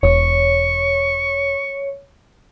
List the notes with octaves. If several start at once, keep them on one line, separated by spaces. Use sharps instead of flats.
E1 C#5 C#6